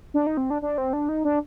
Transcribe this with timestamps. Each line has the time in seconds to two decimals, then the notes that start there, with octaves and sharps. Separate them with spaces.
0.14 D4
0.27 D#4
0.37 C4
0.50 D4
0.62 D4
0.78 C4
0.93 D4
1.09 D#4
1.25 D4